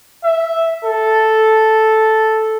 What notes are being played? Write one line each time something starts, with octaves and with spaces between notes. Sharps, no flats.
E5
A4